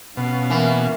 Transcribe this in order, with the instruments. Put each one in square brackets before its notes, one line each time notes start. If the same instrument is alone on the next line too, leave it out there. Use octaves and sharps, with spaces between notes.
[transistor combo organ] B2 [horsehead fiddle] C#4 F5
[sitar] E3 [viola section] A#3